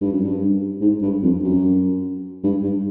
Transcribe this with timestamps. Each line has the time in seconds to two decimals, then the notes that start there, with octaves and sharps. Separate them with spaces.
0.01 G2
0.12 F#2
0.24 G2
0.81 G#2
1.02 G2
1.22 F2
1.43 F#2
2.43 G2
2.63 G2